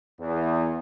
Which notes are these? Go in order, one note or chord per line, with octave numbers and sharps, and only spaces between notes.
E2